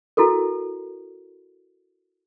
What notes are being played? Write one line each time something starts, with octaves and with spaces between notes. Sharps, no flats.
E4 F#4 A4 A#4